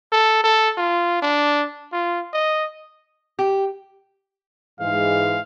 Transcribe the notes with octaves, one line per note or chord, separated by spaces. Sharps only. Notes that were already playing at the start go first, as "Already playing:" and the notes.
A4
A4
F4
D4
F4
D#5
G4
G#2 E3 G#3 F5